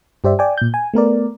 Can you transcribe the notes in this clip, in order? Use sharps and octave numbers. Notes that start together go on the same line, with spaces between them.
G2 G4 C5 D5 E5
D5 G5 G#5
A#2 G6
G#5
A3 B3 A#4 D5